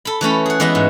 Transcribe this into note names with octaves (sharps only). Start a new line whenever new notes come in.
A4 B5
E3 A3 C#4 B5
G#4 F#5
E3 G#3 B3 D#5 E5
G#2